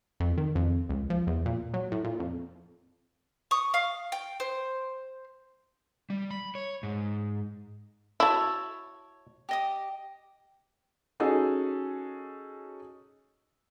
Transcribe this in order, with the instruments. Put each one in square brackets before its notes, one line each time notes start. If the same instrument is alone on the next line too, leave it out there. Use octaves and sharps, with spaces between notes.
[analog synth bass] F2
D#3
F2
C#2
F3
E2
A#2
F#3
A2
A#2
F2
[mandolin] C#6 D#6
F5
G5
C5
[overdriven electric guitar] G3
B5
C#5
G#2
[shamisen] E4 F#4 [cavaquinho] C#5 [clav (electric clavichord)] E5 A5
[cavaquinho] G4 D#5 D#6
[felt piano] C#4 D#4 F#4 G#4 A4